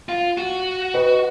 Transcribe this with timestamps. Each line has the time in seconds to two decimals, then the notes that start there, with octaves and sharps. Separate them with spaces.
0.09 F4
0.38 F#4
0.94 B4 D#5